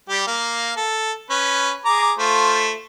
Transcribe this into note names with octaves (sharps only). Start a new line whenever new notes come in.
G3 G4
A#3 F5
A4
C#4 B4
G#4 A#5 D6
A3 F4 C5